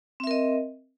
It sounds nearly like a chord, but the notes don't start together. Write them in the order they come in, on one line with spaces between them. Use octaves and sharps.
C4 E5 A#4 D#5